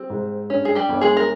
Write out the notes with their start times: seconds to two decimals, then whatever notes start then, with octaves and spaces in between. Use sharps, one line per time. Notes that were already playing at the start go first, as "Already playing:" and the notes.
Already playing: G3 C4
0.10 G#2
0.50 G2 C#4
0.65 G#4
0.75 G3 G4
0.89 G1
1.01 G#3 G#4
1.17 A#4